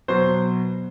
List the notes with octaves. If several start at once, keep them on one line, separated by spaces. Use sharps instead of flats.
B2 F#3 B3 C5